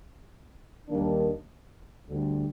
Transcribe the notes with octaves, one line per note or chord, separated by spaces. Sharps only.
D#2 D#3 G3 A#3 D4
D2 D3 G3